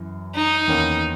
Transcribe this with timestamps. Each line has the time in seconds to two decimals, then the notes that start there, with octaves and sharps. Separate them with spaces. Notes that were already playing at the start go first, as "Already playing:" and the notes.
Already playing: F#2 E3
0.35 D#4
0.68 E2 D#3 A#3 C#4